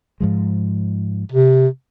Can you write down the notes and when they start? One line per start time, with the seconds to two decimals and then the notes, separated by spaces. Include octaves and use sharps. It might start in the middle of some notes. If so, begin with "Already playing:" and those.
0.20 G#2 F3 G#3
1.32 C3